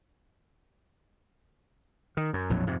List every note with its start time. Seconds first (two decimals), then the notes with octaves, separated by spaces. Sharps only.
2.17 D#3
2.33 F#2
2.49 A#1 F2 A2 F#3
2.67 F2 G#2 C3